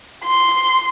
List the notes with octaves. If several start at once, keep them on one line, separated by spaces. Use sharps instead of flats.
C6